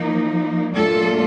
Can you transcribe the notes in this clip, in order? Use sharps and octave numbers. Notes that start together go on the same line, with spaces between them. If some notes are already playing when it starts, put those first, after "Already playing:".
Already playing: F3 A#3 D#4
A#2 F#3 A3 D4 F4 A4